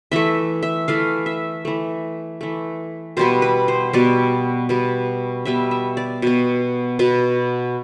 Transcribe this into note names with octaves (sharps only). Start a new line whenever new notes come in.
E3 A3 E5
E5
E3 A3 F5
E5
E3 A3
E3 A3
B2 G3 B3 C5
B4
C5
B2 G3 B3 D5
B2 G3 B3
B2 G3 B3 E5
E5
D5
B2 B3
B2 B3